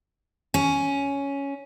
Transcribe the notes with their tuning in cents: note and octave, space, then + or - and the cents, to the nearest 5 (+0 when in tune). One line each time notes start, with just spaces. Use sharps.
C#4 +5